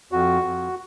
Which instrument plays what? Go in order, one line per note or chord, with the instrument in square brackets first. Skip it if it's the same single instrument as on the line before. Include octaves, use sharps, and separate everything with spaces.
[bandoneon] F2 F#4
F2